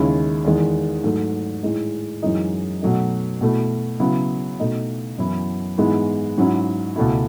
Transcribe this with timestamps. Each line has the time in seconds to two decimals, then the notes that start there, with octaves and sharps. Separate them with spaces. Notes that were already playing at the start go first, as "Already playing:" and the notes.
Already playing: D#2 C#3 G#3 C#4 E4
0.44 E2 D#3 G#3
1.04 G#2 F#3 A3
1.63 A2 G#3 D#4
2.22 F#2 E3 G#3 D#4
2.82 B2 F#3 A3 D#4
3.41 B2 A3 E4
4.00 C#3 F#3 B3 E4
4.60 B2 A3 D#4
5.19 F#2 E3 B3 E4
5.78 G#2 E3 G#3 B3 E4
6.38 G#2 F#3 C#4 E4
6.96 C#2 B2 A3 E4